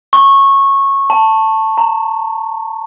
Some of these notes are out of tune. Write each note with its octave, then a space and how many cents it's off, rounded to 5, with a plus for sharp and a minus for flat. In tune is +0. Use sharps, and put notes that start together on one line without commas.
C#6 -15
A5 +10
A#5 -20